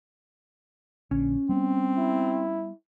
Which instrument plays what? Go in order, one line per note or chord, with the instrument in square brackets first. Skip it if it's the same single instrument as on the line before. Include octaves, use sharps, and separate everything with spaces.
[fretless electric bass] A#1 D3 [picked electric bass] C#4
[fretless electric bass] G3 B3 [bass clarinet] C4
[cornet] E4